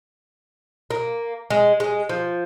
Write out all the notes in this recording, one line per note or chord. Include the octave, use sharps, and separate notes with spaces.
A#3
G#3
G#3
F3